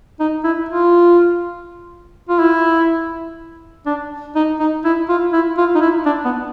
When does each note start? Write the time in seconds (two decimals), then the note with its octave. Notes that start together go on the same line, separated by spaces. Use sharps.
0.20 D#4
0.44 E4
0.69 F4
2.29 F4
2.40 E4
3.86 D4
4.35 D#4
4.60 D#4
4.85 E4
5.09 F4
5.33 E4
5.57 F4
5.75 D#4
5.81 E4
6.06 D4
6.25 B3